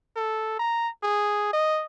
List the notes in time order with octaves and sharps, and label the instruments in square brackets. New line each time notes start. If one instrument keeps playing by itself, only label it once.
[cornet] A4
A#5
G#4
D#5